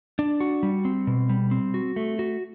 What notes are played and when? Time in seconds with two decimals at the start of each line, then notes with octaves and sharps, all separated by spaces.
0.19 D4
0.40 F#4
0.63 G3
0.85 C4
1.07 B2
1.29 G3
1.51 C4
1.74 F#4
1.96 A3
2.19 F#4